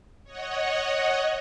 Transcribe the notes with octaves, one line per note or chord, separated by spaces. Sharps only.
C#5 D#5 F#5